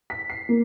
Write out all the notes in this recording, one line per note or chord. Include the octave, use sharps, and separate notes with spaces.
B6
C7
A#3